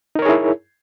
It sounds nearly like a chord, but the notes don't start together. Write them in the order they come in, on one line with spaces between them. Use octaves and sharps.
D#4 A#4 C#5 G#4 E4